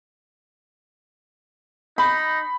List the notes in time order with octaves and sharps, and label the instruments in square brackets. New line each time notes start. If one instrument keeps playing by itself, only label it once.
[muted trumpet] D#4 [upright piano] B5